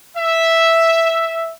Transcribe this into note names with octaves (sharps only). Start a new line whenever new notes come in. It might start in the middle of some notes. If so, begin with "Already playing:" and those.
E5